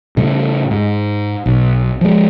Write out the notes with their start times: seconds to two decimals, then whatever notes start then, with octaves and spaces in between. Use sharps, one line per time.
0.17 A2 C#3 G3
0.71 G#2
1.46 B1
2.01 F3 G#3